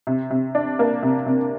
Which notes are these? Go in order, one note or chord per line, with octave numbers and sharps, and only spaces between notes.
C3
C3
D4
A#3
C3
C3